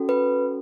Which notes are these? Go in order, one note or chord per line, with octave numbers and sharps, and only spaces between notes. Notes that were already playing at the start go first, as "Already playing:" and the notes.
Already playing: C#4 F#4 A4
B4